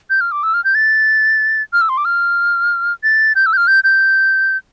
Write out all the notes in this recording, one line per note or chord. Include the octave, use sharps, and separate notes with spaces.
G6
F6
D6
E6
F6
G6
A6
F6
E6
C6
D6
F6
A6
G6
E6
G6
F6
G6
G6